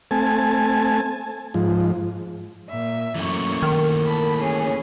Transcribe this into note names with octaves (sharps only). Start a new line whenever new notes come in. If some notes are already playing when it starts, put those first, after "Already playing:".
A3 C4 G#5 A5
G#2 F3
A#2 E5
F#2 E3 A3 A#3 C#6
D#3
A5 B5
C#4 G#4